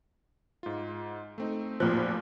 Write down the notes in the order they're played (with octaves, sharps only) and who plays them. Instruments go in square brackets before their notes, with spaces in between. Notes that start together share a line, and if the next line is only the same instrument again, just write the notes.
[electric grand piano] G#2 F4
A3 C4 D#4
[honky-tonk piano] F1 A#2 F3 [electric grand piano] F#4 F6 F#6